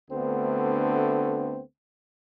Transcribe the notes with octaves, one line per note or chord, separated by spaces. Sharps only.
D2 D3 A3 B3 C4